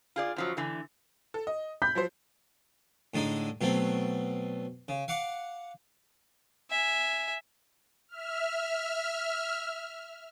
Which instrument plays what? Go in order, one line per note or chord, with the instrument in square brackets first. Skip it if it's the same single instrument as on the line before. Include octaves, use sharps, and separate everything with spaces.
[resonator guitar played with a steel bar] F4 G#4 D5
F#2 F3 F#3
D3 E3 A3
[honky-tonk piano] A4
D#5
[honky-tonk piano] B5 B6 [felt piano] G6
[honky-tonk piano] F3 F#3 C5
[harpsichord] A2 D3 G#3 D#4
B2 F#3 A3 C4
C#3
F5 F#5 D6
[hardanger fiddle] E5 G#5
[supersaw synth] E5 F6